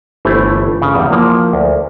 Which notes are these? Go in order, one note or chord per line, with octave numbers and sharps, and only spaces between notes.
G1 E3 A3 E4 C5
C#3
E2 G3
F3 A#3 E4
D2